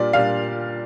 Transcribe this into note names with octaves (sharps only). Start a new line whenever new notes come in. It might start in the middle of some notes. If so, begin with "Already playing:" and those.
Already playing: A#2 G3 D4 F4 D5
A#2 G3 D4 F4 F5